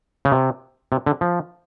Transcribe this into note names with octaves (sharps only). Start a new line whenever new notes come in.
C#3
C3
C3
D3
F3